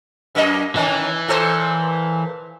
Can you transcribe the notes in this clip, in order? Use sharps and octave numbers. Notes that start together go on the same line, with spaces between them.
F#2 A#3 D#5
D#3 E3 C#4
A#2 A4 C5